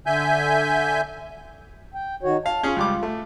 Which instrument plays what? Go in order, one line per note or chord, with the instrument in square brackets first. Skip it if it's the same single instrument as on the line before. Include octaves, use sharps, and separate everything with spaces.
[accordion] D3 E5 G#5 G6
[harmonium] G5
D#3 F#4 C#5
[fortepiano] F5 [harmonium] A5
[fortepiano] C#4 G#4 [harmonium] F4
[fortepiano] C#2 G3 D6
A3